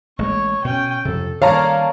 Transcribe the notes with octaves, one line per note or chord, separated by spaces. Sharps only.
A1 G#3 A#3 C#5 C#6
B2 C#4 G5
F2 C3 A4
D#3 G3 A#3 C#5 D5 F5 A5 A#5